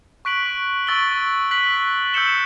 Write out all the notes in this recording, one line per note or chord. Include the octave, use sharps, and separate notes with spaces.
C#6 F#6 B6 D7 F#7
C#6 E6 A6 D7 G7
F#6 B6 F#7
E6 G6 C#7 E7 G7